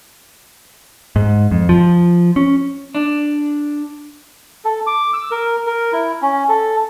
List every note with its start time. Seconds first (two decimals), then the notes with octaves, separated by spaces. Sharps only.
1.16 G#2
1.51 F2
1.69 F3
2.36 C#4
2.95 D4
4.65 A4
4.87 D6
5.13 E6
5.31 A#4
5.67 A#4
5.93 E4
6.22 C#4
6.49 A4